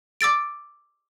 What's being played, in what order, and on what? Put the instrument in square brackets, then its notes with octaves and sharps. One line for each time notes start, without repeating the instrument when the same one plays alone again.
[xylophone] D6 E6 A6 D7